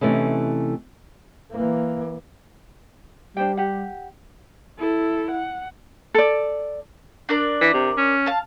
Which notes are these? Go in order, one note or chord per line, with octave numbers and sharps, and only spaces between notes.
C3 E3 A3 C#4 D#4
E3 A#3
G3 D4 C5 G5
G4 F#5
E4 A4
F#5
A4 D5
D4 A#4 D5
E3
C3
C#4
F5 A5